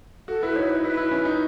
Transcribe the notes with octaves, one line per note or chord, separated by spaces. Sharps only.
F#4 A4
E4 B4
D#4 C#5
E4 B4
E4 B4
E4
C#4
D#4